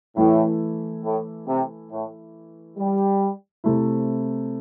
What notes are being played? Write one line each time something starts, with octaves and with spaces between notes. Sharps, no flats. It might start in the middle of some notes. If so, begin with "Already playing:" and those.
A2 E3 A3 E4
A2
C3
A2
G3
C3 A3 C4 E4